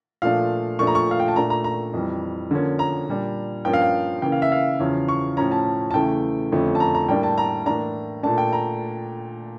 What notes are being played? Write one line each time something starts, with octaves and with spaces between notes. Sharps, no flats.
A#2 F3 A3 D4 F5
A#2 F3 A3 D4 C#6
A#5
C#6
F5
G5
A5
A#2 A3 D4 A#5
A#5
A#5
F2 E3 G3
D3 F3 A#3 C#4
A#5
A#2 G3 D4
G2 F3 A#3 C#4 G5
F5
G5
C#3 E3 A#3 G5
F5
E5
F5
E2 C#3 F3 C#4
C#6
A2 F3 C#4 A#5
A5
A5
E2 C#3 E3 A3 G5
F2 D3 F3 A3 C#4
A5
A#5
A#5
A2 G3 A#3 D4 G5
A5
A#5
A2 E3 A#3 D4 A#5
A#2 A3 D4 A5
G5
A#5